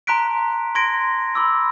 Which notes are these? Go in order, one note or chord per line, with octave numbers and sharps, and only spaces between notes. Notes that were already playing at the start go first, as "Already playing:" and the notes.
A5 A#5 C6 F#6 B6 D7
C6 G#6 A#6 D7
B5 C6 D6 E6